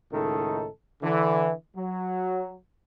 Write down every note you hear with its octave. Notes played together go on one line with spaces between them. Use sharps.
C#2 A2 D#3 D#4 A4
D3 E3
F#3